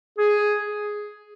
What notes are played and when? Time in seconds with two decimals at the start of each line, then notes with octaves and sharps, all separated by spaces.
0.18 G#4